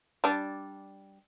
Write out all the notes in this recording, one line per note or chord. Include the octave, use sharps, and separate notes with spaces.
G3 D4